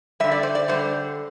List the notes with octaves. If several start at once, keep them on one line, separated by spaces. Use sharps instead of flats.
D3 G3 E5
D5
C5
D5
D3 G3 C5